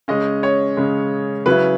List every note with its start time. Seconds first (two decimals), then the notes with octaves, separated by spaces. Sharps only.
0.08 C#3 G#3 C#4 D#5
0.43 C#5
0.77 C#3 G#3 C#4
1.46 C#3 F#3 C#4 E4 B4